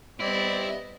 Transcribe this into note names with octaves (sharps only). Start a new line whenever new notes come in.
G3 B3 C4 E4 D5 D#5